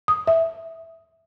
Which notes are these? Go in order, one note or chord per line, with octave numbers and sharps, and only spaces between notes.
D#6
E5